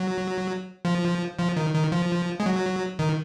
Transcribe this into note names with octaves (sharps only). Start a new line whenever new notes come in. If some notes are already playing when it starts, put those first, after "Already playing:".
Already playing: F#3
F3
F3
D#3
D#3
F3
G#3
F#3
D#3